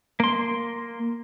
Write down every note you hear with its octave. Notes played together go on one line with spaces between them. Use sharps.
A#3 C6